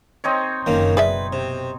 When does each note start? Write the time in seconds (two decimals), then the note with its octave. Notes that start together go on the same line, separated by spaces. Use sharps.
0.24 C4 D#4 C#5
0.66 F#1 F#2 D#3 A#3 C#4
0.97 B2 G#4 B4 D5 E5
1.33 C3